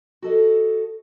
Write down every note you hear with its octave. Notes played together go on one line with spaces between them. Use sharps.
F#4 A4 D#5